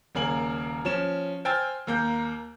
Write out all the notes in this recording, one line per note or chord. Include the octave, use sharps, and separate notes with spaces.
D#1 C#3 A#3 G#5 F#7
F3 C#4 E7
C5 G5 G#5 E6 F6 A6
D#2 A#3 G6